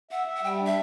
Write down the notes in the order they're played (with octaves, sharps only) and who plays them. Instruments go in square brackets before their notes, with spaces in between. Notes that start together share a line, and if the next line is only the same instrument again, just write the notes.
[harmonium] E5 [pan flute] F#5
[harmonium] E5
[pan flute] F#5
[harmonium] G3 [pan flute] G5
[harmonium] D4
[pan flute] E5